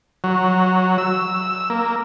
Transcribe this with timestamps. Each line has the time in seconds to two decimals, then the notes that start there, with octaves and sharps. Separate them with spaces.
0.24 F#3
0.98 E6
1.70 A#3